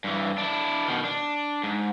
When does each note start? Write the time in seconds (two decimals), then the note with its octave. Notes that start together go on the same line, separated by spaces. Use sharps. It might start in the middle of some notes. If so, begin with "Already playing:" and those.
0.04 G2 E3
0.38 D4 E4
0.88 B2 D#3
1.05 D4
1.63 G#2